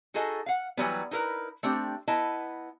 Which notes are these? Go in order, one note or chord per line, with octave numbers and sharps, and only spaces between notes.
D#4 F#4 G#4 A4 D#5
F5 F#5
E3 F#3 G3 B3
D#4 E4 A#4 B4
A3 C4 D4 G4
B3 E4 D#5 A5